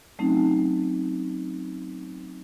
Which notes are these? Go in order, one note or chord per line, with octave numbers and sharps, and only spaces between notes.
F#3 A3 C4 C#4 D#4